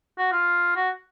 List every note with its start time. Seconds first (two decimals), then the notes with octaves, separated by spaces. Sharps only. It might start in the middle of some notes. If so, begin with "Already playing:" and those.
0.18 F#4
0.32 F4
0.76 F#4